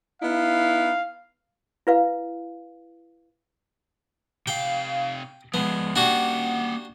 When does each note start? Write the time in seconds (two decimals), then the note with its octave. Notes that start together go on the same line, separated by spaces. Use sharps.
0.22 B3 D#4 E4 F5
1.87 E4 B4 F5
4.47 C3 F5 G5
5.54 F3 G#3 B3
5.96 A#3 D4 F#4 G4 F#5